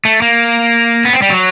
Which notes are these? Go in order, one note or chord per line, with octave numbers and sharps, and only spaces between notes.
A3
A#3
B3
C4
G3
F#3